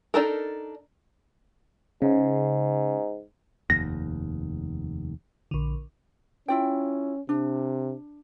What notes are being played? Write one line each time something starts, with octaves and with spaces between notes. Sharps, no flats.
D4 D#4 A4 A#4
G#2 C#3
F1 D#2 A#6
A#1 D3
C#4 E4 F4 G5
C3 D4